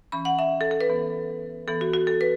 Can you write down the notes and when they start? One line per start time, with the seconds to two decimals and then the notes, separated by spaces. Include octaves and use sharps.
0.12 E3 C#4 B5
0.25 F#5
0.39 E5
0.61 A4
0.71 A4
0.81 B4
0.89 E3 B3
1.68 E3 B3 A4
1.81 F#4
1.94 F#4
2.07 A4
2.21 B4